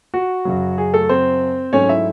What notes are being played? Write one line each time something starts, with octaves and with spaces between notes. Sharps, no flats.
F#4
F#2 C#3 F#3
G#4
A3 A4
C4 C5
G#2 F#3 A3 C#4 C#5
E4 E5